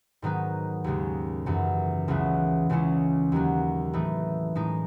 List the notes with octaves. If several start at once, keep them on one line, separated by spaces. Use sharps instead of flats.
G#2 D#3 F#3 B3 D#4
D#2 C#3 G#3
F#2 C#3 E3
C#2 C#3 E3 B3 E4
C#2 C#3 G#3 C#4 E4
D#2 D#3 F#3
A2 E3 A3 D#4
A2 G#3 D#4